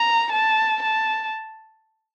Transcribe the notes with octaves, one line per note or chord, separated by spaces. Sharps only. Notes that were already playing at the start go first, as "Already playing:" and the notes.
Already playing: A#5
A5
A5